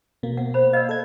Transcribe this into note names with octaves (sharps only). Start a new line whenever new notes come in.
B2 A#3
F#5
C5 B5
D5 D#5 F5 E6
A4 G#6